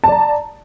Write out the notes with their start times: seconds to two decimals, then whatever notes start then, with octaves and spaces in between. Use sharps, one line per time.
0.04 A5
0.08 D5
0.12 A#5